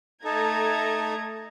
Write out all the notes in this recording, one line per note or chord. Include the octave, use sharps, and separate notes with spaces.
A3 D#4 A4 A#5 G#6